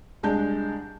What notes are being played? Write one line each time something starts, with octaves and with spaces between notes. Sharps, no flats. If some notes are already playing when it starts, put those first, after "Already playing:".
C2 G#3 D4 A5 G6